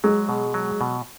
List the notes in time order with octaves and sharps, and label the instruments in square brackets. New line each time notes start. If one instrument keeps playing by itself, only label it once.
[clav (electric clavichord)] F#3 [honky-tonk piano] G#3
[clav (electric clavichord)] B2
F#3
B2